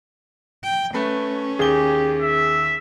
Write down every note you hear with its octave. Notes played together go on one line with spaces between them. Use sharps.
G5
A3 C#4 B4
D#2 G4 G#4 G7
E5